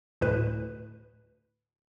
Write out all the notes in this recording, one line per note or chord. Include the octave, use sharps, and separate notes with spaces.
D2 A2 B4